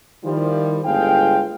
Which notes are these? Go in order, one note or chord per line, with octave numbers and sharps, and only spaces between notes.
D#3 F3 G3 E4
G1 A2 G#3 G#4 F5 G5